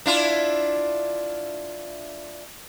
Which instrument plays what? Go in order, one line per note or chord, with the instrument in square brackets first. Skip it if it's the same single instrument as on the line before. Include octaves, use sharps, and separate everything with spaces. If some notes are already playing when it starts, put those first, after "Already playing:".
[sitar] D4 E4 F4